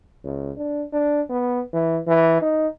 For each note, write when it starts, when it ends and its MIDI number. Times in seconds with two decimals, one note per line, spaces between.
0.24 0.52 37
0.57 0.85 62
0.93 1.22 62
1.30 1.61 59
1.73 2.00 52
2.07 2.39 52
2.42 2.68 63